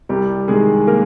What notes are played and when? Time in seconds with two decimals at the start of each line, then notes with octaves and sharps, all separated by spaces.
0.09 C2 G3 G4
0.48 C3 D#3 G#3 G#4
0.87 A#3 A#4